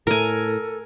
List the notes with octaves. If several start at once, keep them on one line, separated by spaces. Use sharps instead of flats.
A2 A4 A#4 G#5